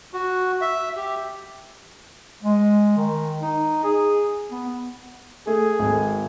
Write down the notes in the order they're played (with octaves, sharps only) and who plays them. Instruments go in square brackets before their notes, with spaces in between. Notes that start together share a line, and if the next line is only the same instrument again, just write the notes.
[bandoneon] F#4
E5
G4
[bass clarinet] G#3
D#3
D#4
G#4
B3
[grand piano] A3 [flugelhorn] G#4
[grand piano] G#1